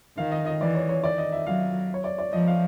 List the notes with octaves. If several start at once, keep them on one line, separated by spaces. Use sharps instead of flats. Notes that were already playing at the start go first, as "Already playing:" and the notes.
D#3 F5
D#5
D#5
E3 D5
C#5
C#5
D#3 D5
D#5
E5
F#3 F5
C#5
D5
D5
F3 D#5
F5